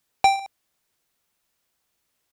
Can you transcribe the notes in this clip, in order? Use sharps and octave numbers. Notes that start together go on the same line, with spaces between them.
G5